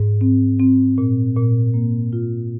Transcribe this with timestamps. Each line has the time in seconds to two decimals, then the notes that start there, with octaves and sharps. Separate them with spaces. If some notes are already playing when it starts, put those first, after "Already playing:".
Already playing: G#2
0.21 C4
0.60 C4
0.98 A#2
1.36 A#2
1.74 A#3
2.13 F4